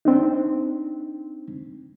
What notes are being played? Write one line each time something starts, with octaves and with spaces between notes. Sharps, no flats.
C4 D4 D#4